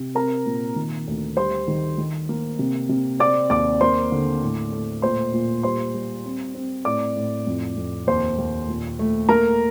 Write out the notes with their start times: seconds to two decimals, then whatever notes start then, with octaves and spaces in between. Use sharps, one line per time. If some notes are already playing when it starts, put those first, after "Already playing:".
Already playing: C3
0.15 C4 A#4 A#5
0.46 A#2
0.76 D#3
1.07 D2
1.37 G3 C5 C6
1.68 D#3
1.98 D#3
2.29 A#3
2.59 C3
2.89 C3
3.19 C4 D5 D6
3.50 D#2 D5 D6
3.81 A#3 C5 C6
4.12 D3
4.42 A2
4.73 A3
5.02 A#2 C5 C6
5.33 A#2
5.63 G3 C5 C6
5.94 G3
6.25 C4
6.55 C4
6.85 A2 D5 D6
7.16 A2
7.47 F2
7.77 F2
8.07 D#2 C5 C6
8.38 D#2
8.68 A#2
8.99 A3
9.29 A#3 A#4 A#5